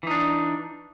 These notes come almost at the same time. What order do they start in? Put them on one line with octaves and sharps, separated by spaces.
E3 D#4 D4